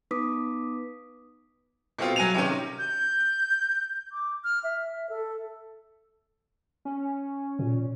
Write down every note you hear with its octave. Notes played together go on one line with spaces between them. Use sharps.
B3 D#4 B4 D6 D#6 B6
B2 A3 C4 F4
F#3 G#5 D#7 F7
C3 D#3 C#4
G6
D6
F6
E5
A4
C#4
A#2